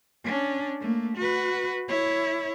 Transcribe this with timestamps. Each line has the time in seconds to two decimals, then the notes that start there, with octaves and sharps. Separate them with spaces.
0.24 C#4 D4
0.80 A3 A#3
1.17 F#4 B4
1.88 E4 C#5